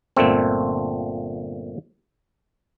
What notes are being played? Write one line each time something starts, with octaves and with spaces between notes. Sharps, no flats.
G1 A#2 A3 C4